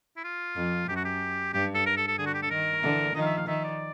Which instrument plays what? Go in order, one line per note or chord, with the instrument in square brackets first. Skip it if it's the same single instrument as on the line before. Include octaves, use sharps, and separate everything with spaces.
[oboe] E4
F4
[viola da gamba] F2
[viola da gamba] F#2 [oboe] G4
[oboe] F#4
G4
[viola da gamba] G2 [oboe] G4
[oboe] A4
A#4
A4
A4
[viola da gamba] D3 [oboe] G#4
[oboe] F#4
G4
A4
[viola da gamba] D#3 [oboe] A#4
[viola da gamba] D3 E3
[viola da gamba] D#3 F3 [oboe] D#5
[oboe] F5
E5
F5
[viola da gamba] D#3 [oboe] E5
[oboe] D5